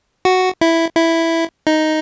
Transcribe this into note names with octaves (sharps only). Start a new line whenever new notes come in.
F#4
E4
E4
D#4